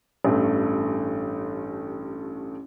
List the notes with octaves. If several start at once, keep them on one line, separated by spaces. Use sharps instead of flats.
A1 G2 A3